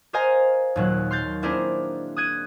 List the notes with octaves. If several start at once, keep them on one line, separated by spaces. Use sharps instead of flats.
A#4 C5 D#5 F5 G#5 A#5
D#2 A#2 F#3 F#6
C6 F6 G6 A6
A#3 C4 D4 E4 G#4 A#4
D#6 F#6 G#6 D#7